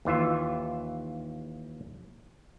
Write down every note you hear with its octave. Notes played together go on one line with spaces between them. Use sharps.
D#2 E3 F4 E5